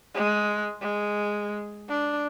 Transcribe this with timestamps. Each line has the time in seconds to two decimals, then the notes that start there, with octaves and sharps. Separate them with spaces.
0.15 G#3
0.82 G#3
1.89 D4